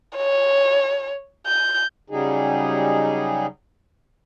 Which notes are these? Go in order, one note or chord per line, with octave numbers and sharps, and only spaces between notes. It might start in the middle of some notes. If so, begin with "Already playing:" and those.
C#5
G6
C#3 F#3 G3 D#4 G#4